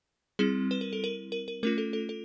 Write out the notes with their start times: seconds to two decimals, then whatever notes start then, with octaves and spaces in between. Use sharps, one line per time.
0.39 G3 C4 E4 G#4
0.71 B4
0.81 A#4
0.93 A4
1.04 A#4
1.32 A#4
1.48 A#4
1.63 A3 C#4 F4 A#4
1.78 A4
1.93 A4
2.09 A4